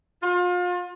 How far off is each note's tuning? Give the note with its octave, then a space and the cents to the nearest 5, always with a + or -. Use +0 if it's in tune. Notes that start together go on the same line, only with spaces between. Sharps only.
F4 +35